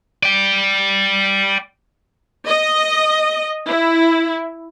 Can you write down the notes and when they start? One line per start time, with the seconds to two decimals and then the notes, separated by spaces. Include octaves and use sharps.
0.23 D5 G5
2.46 D#5
3.67 E4